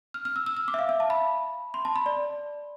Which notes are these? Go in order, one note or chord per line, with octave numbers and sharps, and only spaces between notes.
F6
F6
E6
E6
E6
D6
E5
F5
E5
A5
B5
C6
A5
B5
D5